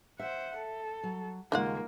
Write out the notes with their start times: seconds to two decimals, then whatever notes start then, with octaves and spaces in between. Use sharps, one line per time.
0.19 C5 E5 F#5
0.57 A4
1.03 F#3
1.52 D#2 C#3 G#3 A#3 D#4 F4 F#5